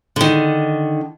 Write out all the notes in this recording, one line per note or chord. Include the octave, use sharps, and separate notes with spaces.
D3 D#3